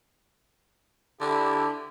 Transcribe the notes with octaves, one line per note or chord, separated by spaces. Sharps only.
D3 D4 E4 G4